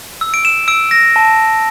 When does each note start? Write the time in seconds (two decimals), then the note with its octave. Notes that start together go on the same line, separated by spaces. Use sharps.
0.21 E6
0.34 D7
0.45 E7
0.68 E6 D7
0.91 A#6
1.16 A5